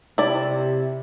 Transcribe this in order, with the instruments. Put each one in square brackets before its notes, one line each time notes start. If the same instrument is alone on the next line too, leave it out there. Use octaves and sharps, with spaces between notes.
[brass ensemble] C3 [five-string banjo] E4 D5